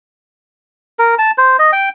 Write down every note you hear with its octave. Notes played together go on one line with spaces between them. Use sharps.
A#4
A5
C5
D#5
G5